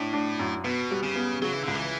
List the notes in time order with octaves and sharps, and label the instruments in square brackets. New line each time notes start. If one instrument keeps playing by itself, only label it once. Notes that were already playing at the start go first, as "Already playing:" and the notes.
Already playing: [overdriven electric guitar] A2 [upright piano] D4
[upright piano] D4
F#2
[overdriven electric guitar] B2 [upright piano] B3
[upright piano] G3
[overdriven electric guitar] C#3
[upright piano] B3
[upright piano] C#3 [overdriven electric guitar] F#3
[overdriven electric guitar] E3
[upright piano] C#2 [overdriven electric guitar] D3
[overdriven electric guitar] E3